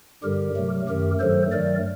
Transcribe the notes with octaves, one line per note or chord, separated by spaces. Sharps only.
G2 D3 G3 G4 A#4
C3 F#3 A3
F#2 D#3 A3 G4 A#4
G2 D#3 F#3 A3 A4 C5
G2 D#3 F#3 A3 A#4 D5